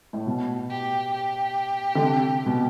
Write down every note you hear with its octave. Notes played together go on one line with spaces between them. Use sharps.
A2
B2
G4
G4
D3
C3
B2